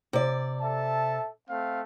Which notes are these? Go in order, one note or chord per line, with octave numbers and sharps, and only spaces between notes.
C3 D5
A4 E5 A5
A3 C4 F5